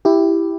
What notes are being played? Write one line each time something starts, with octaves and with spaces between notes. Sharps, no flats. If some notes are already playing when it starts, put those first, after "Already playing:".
E4 G4